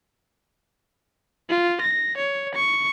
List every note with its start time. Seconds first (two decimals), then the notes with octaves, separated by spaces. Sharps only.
1.50 F4
1.81 A#6
2.18 C#5
2.55 C#6